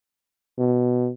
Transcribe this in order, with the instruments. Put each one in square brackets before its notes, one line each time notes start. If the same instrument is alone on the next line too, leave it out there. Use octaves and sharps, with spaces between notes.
[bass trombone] B2